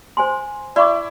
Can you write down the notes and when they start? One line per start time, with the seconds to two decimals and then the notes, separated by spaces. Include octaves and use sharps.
0.17 C5 G#5 C6
0.76 E4 D5 C#6 D6